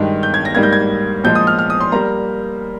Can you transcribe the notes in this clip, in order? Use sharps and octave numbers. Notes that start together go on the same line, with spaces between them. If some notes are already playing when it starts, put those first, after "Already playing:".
Already playing: G2 D#3 G#3
G6
G#6
A#6
G#2 G3 A#3 G#6
G6
G#6
A#2 F3 G#3 G6
D#6
F6
F6
D#6
C6
G3 A#3 A#5